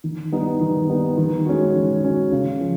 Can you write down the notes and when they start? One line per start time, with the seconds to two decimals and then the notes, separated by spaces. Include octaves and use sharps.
0.04 D#3
0.32 G3 B3 D#4
0.61 D#3
0.89 G3 B3 D#4
1.18 D#3
1.46 G#3 C#4 F#4
1.75 D#3
2.03 G#3 C#4 F#4
2.32 C#3
2.61 F3